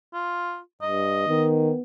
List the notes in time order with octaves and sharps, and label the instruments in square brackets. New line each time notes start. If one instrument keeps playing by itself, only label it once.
[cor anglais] F4
[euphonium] G2 [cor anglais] D#5
[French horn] D#3 [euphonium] B3